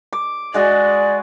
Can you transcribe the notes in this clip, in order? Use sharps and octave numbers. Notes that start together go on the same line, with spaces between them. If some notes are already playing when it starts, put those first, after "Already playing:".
D6
G#3 F#4 G#4 D5